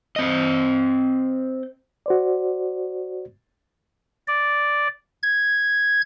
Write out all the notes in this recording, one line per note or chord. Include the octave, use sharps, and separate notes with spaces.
C4 D#5
F#4 C5 D5
D5
G#6